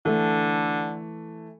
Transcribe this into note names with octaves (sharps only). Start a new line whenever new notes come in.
D3 E3 A3